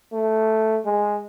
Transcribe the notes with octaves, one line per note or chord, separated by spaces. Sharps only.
A3
G#3